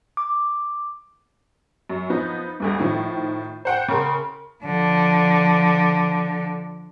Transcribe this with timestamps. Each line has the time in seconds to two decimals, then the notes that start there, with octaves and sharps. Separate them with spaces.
0.17 D6
1.90 F#2
2.10 F3 B3 D#4
2.60 G1 D2 G2
2.79 A2 D#3 F3
3.65 C5 F#5 G5
3.89 C#3 A#4 C6
4.63 D3 F3